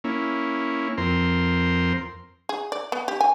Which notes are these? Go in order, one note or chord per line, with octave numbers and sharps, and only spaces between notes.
A#3 C#4 E4
F2 C4 A#4 C6
G#4
D5
B3
G4
G#5